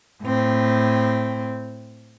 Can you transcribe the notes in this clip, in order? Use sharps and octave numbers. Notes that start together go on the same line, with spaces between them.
A2 C4